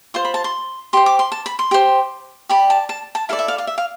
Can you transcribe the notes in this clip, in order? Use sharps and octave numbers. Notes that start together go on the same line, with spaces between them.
F4 C5 C6
B5
A5
C6
G4 C5 C6
D6
C6
A5
B5
C6
G4 C5
G4 D5 B5
A5
A5
A5
E4 A4 D5 F5
E5
F5
F5
E5
F5